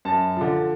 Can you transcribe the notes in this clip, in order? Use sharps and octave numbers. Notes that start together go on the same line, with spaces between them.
F#2 A5
D3 F3